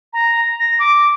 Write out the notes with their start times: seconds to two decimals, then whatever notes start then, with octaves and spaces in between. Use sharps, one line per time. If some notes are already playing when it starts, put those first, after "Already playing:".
0.13 A#5
0.59 A#6
0.79 D6